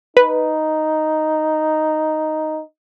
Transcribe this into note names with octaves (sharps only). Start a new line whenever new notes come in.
D#4 B4